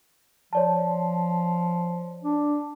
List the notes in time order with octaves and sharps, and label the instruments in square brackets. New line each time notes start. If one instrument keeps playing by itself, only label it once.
[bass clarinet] F3 [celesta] C#5 D5 A5
[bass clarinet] D4